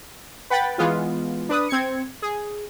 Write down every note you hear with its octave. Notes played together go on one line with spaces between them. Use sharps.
B4 F#5 G5 B5 A6
E3 G#3 B3 F4
D4 B4 D#6
C4 G#6 C#7
G#4